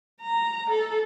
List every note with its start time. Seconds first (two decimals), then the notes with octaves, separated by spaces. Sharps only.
0.21 A#5
0.70 A4